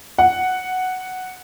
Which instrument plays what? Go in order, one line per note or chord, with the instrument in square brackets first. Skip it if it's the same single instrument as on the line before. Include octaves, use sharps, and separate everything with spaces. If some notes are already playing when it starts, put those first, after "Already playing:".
[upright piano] F#5